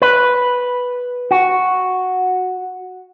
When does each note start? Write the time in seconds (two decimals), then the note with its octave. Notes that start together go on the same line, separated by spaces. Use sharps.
0.02 B4
1.31 F#4